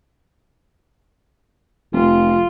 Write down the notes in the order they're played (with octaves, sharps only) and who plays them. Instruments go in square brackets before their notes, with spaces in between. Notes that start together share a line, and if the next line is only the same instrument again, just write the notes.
[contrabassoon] F1 [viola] F4